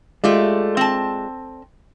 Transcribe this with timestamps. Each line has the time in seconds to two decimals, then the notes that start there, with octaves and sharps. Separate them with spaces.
0.24 G#3 A3 F4 G4 D5
0.77 C4 A5